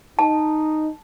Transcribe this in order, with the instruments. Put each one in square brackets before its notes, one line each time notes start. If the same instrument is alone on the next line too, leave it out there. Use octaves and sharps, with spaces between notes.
[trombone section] D#4 [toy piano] A5